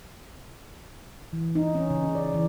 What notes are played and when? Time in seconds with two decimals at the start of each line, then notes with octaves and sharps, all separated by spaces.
1.33 E3
1.55 D#4
1.75 C#4
1.90 C#3
2.15 D5
2.34 E3